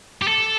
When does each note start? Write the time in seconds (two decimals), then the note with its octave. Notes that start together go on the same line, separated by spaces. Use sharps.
0.22 G4
0.28 A4